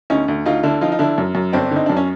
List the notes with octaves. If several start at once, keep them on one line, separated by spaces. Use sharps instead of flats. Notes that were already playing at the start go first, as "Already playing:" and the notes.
D2 C#4 D#4
D2
D2 D#4 F4
D3 D4 E4
F3 D#4 F4
D#4
D3 D4 E4
F#2
F#2
G1 C4 D4
D3 D#4
F#2 D4
C#4